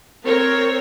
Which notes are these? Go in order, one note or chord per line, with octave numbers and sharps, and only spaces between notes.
C4 A#4 C#5